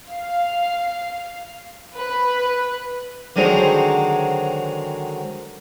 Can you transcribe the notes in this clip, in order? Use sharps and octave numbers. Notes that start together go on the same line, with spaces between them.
F5
B4
D3 D#3 F#3 G#3 C4